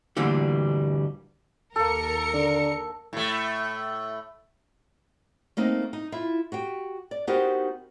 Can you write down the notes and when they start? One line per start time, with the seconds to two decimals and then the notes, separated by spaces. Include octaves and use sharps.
0.17 D2 A#2 D3 E3 G3
1.76 D#2 A#3 A4 A#4 C#7
2.34 D3
3.13 A2 A3
5.57 A3 A#3 C4 D#4
5.93 D#4
6.12 E4 F4 E5
6.52 F#4 G4 G5
7.11 D5
7.27 B3 D#4 F#4 G4 A#4 C5